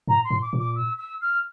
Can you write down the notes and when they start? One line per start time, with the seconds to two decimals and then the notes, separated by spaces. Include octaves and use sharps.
0.08 A2 A#5
0.24 C6
0.31 A2
0.42 D6
0.53 A#2
0.59 D6
0.75 E6
0.98 E6
1.21 F6